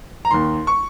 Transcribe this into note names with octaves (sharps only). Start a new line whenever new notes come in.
A#5
D#2 D#3 C6
C#6